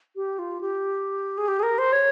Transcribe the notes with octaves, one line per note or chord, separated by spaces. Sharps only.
G4
F4
G4
G#4
G4
G#4
A#4
C5
C#5